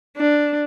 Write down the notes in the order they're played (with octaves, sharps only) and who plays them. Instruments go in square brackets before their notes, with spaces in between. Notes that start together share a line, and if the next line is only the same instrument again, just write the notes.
[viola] D4